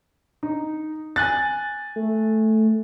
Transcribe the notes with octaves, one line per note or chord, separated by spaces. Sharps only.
D#4
G#5 F#6 A6
A3